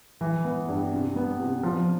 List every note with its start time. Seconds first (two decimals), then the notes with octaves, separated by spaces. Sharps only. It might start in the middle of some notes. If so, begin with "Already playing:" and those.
0.21 E3
0.45 B3
0.68 G2
0.92 C3
1.16 B3
1.40 C3
1.63 F3